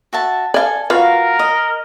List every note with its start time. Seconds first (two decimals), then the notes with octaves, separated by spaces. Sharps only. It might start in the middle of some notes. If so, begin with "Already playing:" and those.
0.13 F#4 E5 A5
0.54 A4 D5 F5 G#5
0.90 F4 F#4 A#4 B4 F5
1.39 D#5